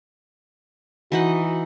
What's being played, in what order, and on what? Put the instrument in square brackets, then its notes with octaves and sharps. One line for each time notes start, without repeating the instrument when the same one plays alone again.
[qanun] E3 D#4 F#5 [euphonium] F#4